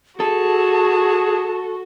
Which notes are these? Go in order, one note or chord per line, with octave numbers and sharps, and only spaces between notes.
F#4 G#4 A4 A5